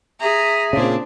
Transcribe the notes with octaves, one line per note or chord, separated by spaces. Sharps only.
G#4 E5 A#5
A#2 C#3 C4 D4